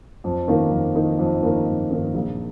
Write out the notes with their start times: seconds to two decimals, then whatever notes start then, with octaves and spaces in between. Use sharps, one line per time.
0.24 F2
0.48 D#3 A#3 D#4 A#4
0.71 F2
0.95 D#3 A#3 D#4 A#4
1.19 F2
1.42 D#3 A#3 D#4 A#4
1.66 F2
1.90 D#3 A#3 D#4 A#4
2.14 A#1